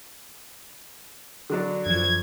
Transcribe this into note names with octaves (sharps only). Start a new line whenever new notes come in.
D3 F#3 D4
F#2 F3 G#6